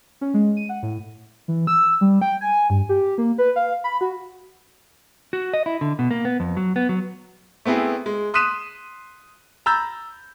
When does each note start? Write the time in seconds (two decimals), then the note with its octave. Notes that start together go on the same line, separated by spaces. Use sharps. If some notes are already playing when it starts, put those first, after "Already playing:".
0.21 C#4
0.34 G#3
0.57 D#7
0.69 F#5
0.83 A2
1.48 E3
1.67 E6
2.01 G3
2.21 G5
2.41 G#5
2.70 G2
2.89 G4
3.18 A#3
3.38 B4
3.56 F5
3.84 B5
4.01 F#4
5.33 F#4
5.54 D#5
5.66 E4
5.81 D3
5.99 B2
6.11 A#3
6.25 B3
6.40 F2
6.57 F#3
6.76 B3
6.89 F#3
7.65 A3 B3 C4 E4 G#4
8.06 G#3
8.34 C6 D#6 F#6 B6 D#7 E7
9.66 A#5 B5 E6 G6 A6